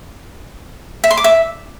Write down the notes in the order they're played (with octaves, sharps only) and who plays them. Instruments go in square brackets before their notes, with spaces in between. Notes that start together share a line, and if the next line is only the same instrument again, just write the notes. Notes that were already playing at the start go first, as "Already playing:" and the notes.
[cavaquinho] E5
C6
D6
E5